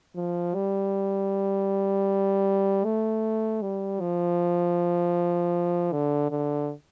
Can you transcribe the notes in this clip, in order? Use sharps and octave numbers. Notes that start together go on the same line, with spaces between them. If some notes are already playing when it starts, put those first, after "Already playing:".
F3
G3
A3
G3
F3
D3
D3